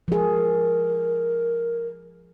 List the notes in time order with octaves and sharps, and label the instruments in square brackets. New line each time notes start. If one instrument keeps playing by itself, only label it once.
[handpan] F3 G#4 [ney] A#4